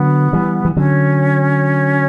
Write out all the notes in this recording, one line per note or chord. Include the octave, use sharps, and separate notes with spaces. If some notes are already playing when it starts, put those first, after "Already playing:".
Already playing: D3 F#3 B3
E3 G3
E3
D3 F#3 C#4